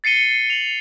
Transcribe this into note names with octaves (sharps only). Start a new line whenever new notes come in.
A6 C7 C#7 D#7 G7
F7 F#7